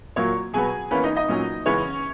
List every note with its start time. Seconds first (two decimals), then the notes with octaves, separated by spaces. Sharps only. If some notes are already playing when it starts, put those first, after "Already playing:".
0.16 A#2 F#3 A#3 C#5 C#6
0.54 B2 F#3 B3 G#4 G#5
0.91 E3 A#3 B3 C#4 B4
1.04 D#4 D#5
1.16 D#4 D#5
1.28 A#2 F#3 C#4
1.66 C#3 E3 G#3 B3 C#4 C#5